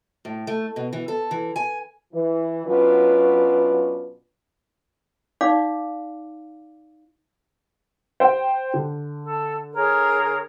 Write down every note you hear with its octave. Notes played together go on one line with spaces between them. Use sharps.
A2
A3
B2
E3
A4
E3
G#5
E3
B2 F#3 C#4 D4 F4 B4
D#4 D5 F5 D6
C5 G5
D3
A4
G#4 A#4 C#5